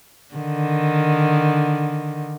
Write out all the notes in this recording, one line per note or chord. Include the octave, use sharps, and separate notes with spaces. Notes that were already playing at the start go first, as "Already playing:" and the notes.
D3 D#3